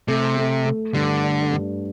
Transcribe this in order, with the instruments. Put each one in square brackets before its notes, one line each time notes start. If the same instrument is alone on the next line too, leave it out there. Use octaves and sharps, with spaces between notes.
[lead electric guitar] C3 [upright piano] A3
[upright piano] A3
A3
[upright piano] G2 [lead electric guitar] D3
[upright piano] D4
G2